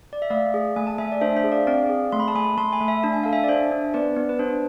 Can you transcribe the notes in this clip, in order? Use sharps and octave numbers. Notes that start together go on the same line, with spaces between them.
D5
E5
A3 D5 F5
G#4
A3 G#5
A5
A3 E5 G#5
D5
D4 C5 E5
C5 E5
G#4
D5 F5
C4 D5 F5
G#4
A3 C6
B5
A5
A3 G#5 B5
A3 A5 C6
G#5 B5
A3
E5 G#5
D4 A5
G#5
A4 F5
E5 G#5
D5
D4 C5 E5
D4
B3 B4 D5
B3
B4
D4 C5